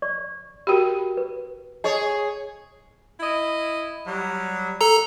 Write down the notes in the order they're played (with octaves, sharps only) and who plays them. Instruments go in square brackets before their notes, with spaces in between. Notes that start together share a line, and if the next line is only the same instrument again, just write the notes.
[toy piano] D5 C#6
[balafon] F#4 G4 [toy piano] A#4 G5 B5
[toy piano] B4
[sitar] G#4 C#5 [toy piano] D#5
[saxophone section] E4 D#5
F#3 G3
[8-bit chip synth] A4 A#5